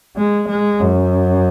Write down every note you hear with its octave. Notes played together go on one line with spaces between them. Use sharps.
G#3
G#3
F#2